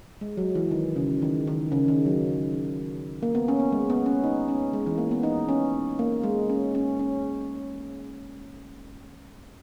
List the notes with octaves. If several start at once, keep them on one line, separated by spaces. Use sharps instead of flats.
G#3
F#3
E3
D#3
C#3
D#3
D#3
C#3
D#3
F#3
A#3
B3
C#4
B3
G#3
B3
C#4
D#4
C#4
G#3
E3
A#3
B3
D#4
C#4
A#3
G#3
C#4
C#4
C#4